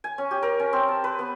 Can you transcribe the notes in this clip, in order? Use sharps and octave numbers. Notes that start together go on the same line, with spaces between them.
G#5
C#4
G4
A#4
C#4
C4
A5
B4
B3